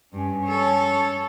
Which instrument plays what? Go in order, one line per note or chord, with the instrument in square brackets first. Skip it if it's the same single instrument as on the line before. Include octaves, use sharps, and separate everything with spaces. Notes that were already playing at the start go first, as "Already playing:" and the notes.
[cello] G2 [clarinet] C#4
[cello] A4 C#5